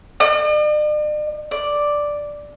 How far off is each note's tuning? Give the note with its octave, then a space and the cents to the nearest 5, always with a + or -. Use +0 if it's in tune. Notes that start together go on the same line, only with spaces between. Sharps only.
D5 +45
D5 +0